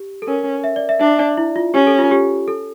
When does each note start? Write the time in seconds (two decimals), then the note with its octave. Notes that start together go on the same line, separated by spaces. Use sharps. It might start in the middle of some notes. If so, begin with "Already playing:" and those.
Already playing: G4
0.22 A4
0.27 C#4 A#4
0.64 E5
0.76 D5
0.89 E5
1.00 D4 E5
1.19 D5
1.37 E4
1.56 F4
1.74 C#4 G4
1.87 A4
1.98 F4
2.11 G4
2.48 A4